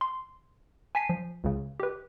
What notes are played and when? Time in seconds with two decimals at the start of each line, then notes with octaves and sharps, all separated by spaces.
0.01 C6
0.95 G#5 A5 B6 C7 D#7
1.09 F3
1.44 C#2 C#3
1.80 G4 B4